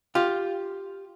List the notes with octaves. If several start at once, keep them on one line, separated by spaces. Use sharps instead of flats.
F4 G4